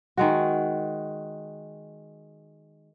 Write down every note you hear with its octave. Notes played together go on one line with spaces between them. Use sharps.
D#3 G#3 F#4